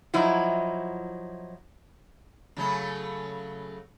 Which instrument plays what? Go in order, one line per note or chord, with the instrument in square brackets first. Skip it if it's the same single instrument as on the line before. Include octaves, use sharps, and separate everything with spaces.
[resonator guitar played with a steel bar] F3 F#3 D#4 E4
[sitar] C#3 F#3 A3